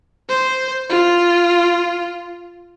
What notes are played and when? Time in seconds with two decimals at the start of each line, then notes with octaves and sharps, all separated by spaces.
0.29 C5
0.89 F4